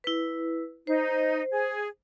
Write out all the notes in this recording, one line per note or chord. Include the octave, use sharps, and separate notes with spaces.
E4 B4
D#4 C5
G#4